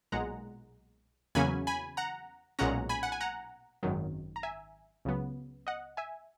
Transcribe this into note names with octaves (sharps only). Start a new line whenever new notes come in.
B1 A#2 G#3 F#5 A#5
E2 C#3 F#3 A#3 C#4 G#5 B5
G#5 B5
F#5 A#5
B1 A#2 G#3 C#4 F#5 A#5
G#5 B5
F#5
G#5
F#5 A#5
G#1 F#2 D#3 F#3
A#5
E5 G#5
C#2 C#3 F#3 B3
D#5 F#5
E5 G#5